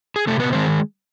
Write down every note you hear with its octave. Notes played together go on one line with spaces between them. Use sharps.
G#4
C3 A3 A4
B3 B4
D#3 G#3 C4 C5